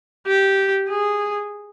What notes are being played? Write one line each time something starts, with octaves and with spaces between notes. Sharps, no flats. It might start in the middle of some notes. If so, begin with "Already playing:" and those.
G4
G#4